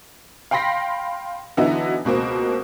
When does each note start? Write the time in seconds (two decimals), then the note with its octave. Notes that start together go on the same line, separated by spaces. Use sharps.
0.51 F5 G5 B5 C6 A#6 B6
1.57 D3 E3 F#3 B3 D#4 E4
2.05 C#2 B2 A#3 C4